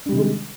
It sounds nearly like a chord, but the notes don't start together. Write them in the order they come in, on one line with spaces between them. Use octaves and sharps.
D4 G3 C3 D#3 G#3